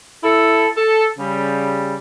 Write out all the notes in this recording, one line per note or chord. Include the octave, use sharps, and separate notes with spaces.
E4 A4
A4
C#3 G3